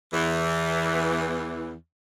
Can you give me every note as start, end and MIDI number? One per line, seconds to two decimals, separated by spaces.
0.13 1.74 40
0.13 1.74 52